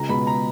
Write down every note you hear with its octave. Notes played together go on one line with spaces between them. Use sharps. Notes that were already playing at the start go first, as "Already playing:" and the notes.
Already playing: C#2 A#5
B2 G#3 B5
A#5